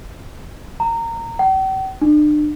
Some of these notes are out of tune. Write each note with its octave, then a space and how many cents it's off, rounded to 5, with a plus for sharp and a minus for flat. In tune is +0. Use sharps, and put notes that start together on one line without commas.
A#5 -20
G5 -45
D4 +35